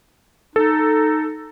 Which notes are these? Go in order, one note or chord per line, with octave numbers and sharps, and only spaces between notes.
D#4 A4